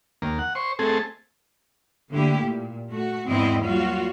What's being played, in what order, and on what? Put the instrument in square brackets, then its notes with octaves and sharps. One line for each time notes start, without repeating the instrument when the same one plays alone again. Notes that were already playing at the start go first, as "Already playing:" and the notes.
[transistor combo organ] D#2 A#3
F#5
C5 C#6
A3 C4 G#4 A4
[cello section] D3 A3 A#3 E4 G4
A#2
A3 F#4
E2 G#2 B3 C4 E4 D#5
F#3 G3 A#3 F4 F#4